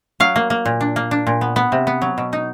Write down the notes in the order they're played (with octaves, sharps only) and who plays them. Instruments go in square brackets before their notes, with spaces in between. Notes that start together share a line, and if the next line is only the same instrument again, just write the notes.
[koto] F#3 F5
A#3
A#3
A#2
D4
A#3
D4
A#2
B3
B3
C3
B3
F#3
B2
D#4